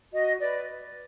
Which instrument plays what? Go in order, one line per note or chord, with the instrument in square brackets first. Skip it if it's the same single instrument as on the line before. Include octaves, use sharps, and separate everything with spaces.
[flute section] F#4 D#5
B4 D5